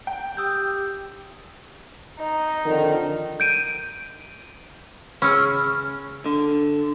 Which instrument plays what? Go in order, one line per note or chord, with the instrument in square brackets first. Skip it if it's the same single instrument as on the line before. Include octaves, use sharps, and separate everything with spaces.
[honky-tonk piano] G5
[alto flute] G4 [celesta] D#6 E6 G6
[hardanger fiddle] D#4
[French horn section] F2 D3 D#3
[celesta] G6 D7 D#7
[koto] C#3 C#4 [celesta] B5 E6 F6
[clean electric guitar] D3